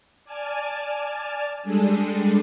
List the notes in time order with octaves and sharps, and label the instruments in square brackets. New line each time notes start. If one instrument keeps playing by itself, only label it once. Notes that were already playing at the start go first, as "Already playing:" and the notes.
[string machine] D5 G#5 A5 F6
G3 G#3 D4 G#4 A4